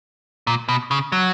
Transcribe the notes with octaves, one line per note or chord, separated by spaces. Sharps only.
A#2
B2
C#3
F#3